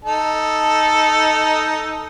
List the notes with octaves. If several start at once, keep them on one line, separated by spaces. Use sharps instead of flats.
D#4 A4